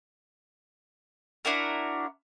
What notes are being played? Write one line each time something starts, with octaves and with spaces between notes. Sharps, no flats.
D4 E4 F#4 A#4